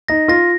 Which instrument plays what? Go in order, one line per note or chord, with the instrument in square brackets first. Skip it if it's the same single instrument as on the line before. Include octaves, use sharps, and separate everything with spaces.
[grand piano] D#4 [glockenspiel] A#6
[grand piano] F4 [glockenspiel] A#6